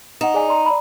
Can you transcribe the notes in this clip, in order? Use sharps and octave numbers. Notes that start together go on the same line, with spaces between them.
D#4 F#5 E7
G#4 D5 G#5
D5 A#5 C6
D5 A#5 B5